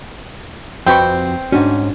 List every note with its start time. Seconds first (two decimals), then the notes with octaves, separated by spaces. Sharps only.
0.87 F2 C4 F#4 B4 G5 B5 C#6
1.52 G#2 C#4 D4 F#4